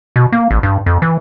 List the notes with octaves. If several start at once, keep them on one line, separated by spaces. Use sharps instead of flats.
B2
A#3
A1
G2
F2
E3